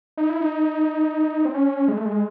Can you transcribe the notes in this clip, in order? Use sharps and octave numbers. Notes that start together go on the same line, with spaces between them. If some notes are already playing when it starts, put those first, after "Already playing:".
D#4
E4
D#4
C4
C#4
G#3
A3
G#3